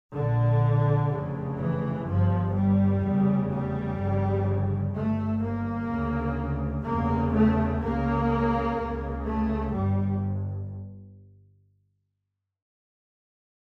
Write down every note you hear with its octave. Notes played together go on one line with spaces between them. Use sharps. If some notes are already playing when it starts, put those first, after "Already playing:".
A#1 A#2 D3
F1 F2 C#3
E3
G1 G2 F3
G3
F1 E2 C#3
G3
G1 F2 C#3
G1 G2 A3
A#3
D2 C#3
F1 E2 C#3 A#3
A3
C#2 C#3 A#3
C#2 C#3
A3
G1 G2 G3